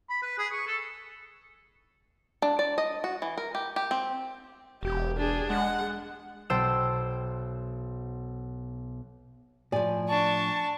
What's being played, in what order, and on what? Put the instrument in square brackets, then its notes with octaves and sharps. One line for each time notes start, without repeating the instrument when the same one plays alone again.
[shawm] B5
B4
G#4
C#6
A4
[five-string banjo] D4
D5
D#5
F#4
E3
A#4
G4
G4
C4
[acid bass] E1 [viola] G4
[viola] D4 G#4
[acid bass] G#3 [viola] F#5
[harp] B1 C5 G5 A5 E6 E7
[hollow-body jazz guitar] A2 F3 [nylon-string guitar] D5 G#5
[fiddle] D4 C#6 [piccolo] A5